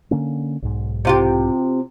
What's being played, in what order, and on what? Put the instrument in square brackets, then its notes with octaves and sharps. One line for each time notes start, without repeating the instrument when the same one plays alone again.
[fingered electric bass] D3 A#3 C#4
B1 G#2
[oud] C3 F4 G4